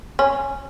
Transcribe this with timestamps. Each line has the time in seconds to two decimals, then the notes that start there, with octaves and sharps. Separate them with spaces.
0.19 C#4